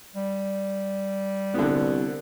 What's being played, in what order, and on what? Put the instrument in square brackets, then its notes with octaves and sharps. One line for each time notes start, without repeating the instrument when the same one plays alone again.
[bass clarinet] G3
[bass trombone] C2 [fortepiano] D3 B3